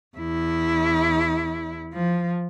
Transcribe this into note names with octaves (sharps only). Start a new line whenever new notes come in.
E2 E4
F3